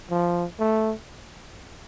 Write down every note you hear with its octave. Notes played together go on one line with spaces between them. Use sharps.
F3
A3